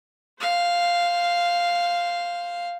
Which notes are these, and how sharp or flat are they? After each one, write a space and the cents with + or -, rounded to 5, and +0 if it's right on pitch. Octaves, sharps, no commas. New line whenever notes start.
C5 +0 F5 +0